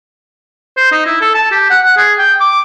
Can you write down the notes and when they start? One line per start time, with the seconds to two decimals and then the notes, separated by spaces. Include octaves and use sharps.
0.77 C5
0.92 D#4
1.06 E4
1.21 A4
1.35 A5
1.52 G4
1.70 F#5
1.85 F#5
1.97 G#4
2.19 G5
2.40 D6